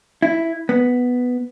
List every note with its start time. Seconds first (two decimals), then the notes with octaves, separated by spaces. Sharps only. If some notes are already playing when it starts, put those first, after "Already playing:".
0.22 E4
0.69 B3